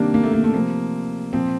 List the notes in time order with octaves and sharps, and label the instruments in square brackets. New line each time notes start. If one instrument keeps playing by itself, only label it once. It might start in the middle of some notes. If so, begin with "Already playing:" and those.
Already playing: [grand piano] C3 D#3 G3 A#3 D4
A#3
A3
A#3
A3
C3 F3 A#3
A#2 F3 C4